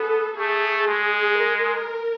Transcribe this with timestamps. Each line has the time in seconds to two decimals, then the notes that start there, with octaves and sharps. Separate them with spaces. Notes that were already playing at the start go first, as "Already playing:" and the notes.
Already playing: B3 A4
0.38 A3 G#4
0.87 G#3 G#4
1.38 A#4